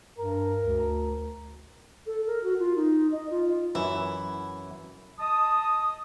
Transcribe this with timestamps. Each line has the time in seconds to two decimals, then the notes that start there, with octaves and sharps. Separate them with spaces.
0.18 G2 A#4
0.60 D2
2.07 A4
2.27 A#4
2.44 F#4
2.59 F4
2.76 D#4
3.12 D#5
3.30 F4
3.75 F#2 E3 E4
5.19 D#5 A5 D#6